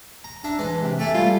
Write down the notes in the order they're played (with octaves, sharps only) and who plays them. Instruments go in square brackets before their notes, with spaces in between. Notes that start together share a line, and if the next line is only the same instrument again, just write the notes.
[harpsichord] A#5
[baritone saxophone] D4 [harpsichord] E5 A5 A#5
[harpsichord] E3 A5 [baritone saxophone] G#3
[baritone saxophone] C3
[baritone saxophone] A3 [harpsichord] E5 G#5 D6
[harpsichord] G3 A3 [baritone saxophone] F4